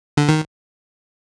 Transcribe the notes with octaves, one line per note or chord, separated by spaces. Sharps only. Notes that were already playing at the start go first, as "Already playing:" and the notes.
D3
D#3